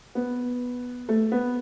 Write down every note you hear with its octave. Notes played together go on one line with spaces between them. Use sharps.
B3
A3
B3